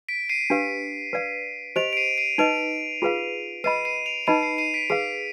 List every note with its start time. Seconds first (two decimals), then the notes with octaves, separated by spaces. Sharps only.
0.09 B6 D7
0.29 C7 D#7
0.50 D4 G4 B4 F5
1.13 B4 D5 F5
1.76 G4 C5 D#5 D7 F7
1.93 D7
1.97 C7 D#7
2.18 C7 D#7
2.38 D#4 B4 D#5 D7 F7
3.02 F4 G#4 B4 F5
3.64 B4 D#5 B5 C7 D#7
3.85 C7 D#7
4.06 D7 F7
4.27 D#4 B4 D#5 B5 C7 D#7
4.43 C7
4.58 C7 D#7
4.74 B6 D7
4.90 G#4 B4 F5 C7